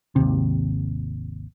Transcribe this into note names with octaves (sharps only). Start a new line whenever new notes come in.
G#1 D#2 C3